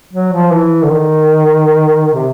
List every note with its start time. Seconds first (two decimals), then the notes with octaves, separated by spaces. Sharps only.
0.13 F#3
0.33 F3
0.52 E3
0.83 D3
0.91 D#3
2.14 C3